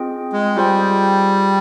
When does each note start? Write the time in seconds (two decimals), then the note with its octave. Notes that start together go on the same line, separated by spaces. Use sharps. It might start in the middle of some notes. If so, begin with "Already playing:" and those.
Already playing: C4 F4 G#4 D#5 G5
0.33 G#3
0.56 G3 F4 G#4 C5 G5